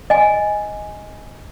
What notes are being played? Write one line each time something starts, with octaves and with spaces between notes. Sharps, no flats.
D#5 G#5